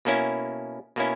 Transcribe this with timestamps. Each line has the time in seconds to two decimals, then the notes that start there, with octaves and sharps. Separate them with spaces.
0.05 B2 A#3 C#4 E4
0.96 B2 A#3 C#4 E4